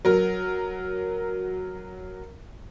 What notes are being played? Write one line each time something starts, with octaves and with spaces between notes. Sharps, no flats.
F#3 A#4